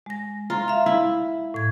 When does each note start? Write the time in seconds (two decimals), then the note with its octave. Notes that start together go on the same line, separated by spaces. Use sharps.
0.06 G#3 A#6
0.50 F4 A#5
0.68 E5 F5
0.86 E4
1.54 A2 G#6